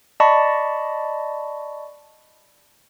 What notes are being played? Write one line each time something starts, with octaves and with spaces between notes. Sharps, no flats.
D5 D#5 A5 B5 C#6